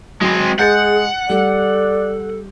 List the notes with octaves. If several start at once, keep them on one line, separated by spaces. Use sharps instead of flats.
F#3 G#3 C4
G#3 G#4 F#5 G6 A6 C#7
G3 A4 D5